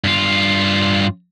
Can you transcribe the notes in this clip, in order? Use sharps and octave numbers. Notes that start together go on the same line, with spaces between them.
G2 F4